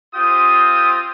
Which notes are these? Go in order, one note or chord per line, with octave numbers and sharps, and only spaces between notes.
C4 F4 G4 D#6